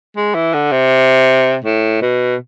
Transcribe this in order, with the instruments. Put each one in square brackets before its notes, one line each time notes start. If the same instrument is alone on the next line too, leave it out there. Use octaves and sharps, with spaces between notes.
[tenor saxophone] G#3
E3
D3
C3
A2
B2